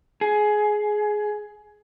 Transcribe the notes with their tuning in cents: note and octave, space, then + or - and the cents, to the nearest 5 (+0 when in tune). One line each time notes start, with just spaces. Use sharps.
G#4 +15